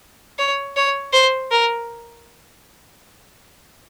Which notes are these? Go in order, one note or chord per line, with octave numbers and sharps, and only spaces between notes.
C#5
C#5
C5
A#4